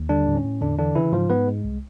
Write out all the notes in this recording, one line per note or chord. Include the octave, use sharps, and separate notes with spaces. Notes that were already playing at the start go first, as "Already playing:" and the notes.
Already playing: D#2
D3 G3 D4
A2
C#4
A2
E2 D3 D4
D3 E3 D4
C#3 E3 E4
G#2 F3 F4
G#2 B3 B4
G#3
C2